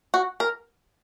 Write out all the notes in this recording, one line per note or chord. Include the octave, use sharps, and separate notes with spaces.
F#4
A#4